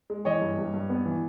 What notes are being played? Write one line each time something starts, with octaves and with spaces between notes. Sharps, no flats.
G#3
E3 C#5 D#5
G2
G2
G2
B3
E3